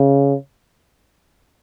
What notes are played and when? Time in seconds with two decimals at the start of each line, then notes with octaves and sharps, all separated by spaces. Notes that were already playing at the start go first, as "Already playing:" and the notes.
Already playing: C#3